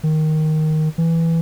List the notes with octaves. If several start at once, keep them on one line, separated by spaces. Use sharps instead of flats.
D#3
E3